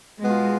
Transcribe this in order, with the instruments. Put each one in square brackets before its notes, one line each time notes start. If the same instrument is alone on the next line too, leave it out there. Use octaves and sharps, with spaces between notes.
[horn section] B2 B3 F4 [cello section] G#3